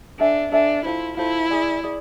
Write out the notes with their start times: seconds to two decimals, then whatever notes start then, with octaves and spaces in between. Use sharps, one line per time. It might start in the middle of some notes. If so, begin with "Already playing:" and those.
0.19 D4 A4 E5 G#5
0.52 D4 A4 E5 G#5
0.85 E4 F4 A4 C5
1.17 E4 F4 A4 C5
1.50 G#4 D5 G#5
1.83 G#4 D5